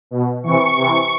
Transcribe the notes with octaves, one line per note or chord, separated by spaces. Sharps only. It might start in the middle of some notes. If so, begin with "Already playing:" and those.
B2
C3 E3 C#6
C3 E3